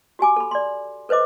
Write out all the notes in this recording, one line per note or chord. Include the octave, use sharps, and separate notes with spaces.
F#4 G4 G#5 D6
A4 B5
D5 C6
A4 B4 C5 D#5 D6